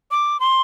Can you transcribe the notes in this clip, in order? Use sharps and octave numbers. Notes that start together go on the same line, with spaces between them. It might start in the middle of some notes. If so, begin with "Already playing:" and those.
D6
C6